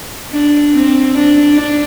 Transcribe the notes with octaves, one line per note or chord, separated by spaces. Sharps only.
D4
C4
D4
D4